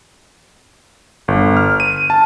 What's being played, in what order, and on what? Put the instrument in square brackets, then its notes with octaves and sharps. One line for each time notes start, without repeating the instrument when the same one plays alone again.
[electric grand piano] G1
F6
D#7
A5